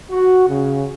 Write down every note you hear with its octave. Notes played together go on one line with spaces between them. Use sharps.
F#4
C#3